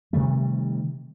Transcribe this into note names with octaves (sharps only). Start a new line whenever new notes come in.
C3 D#3 G3 A3